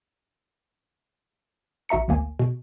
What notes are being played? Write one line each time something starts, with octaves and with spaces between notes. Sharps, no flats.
A1 F#4 E5 A#5 C#7
G#1 D2 A#3 G#5
B2